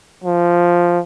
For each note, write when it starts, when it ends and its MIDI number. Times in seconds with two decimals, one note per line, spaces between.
0.24 1.00 53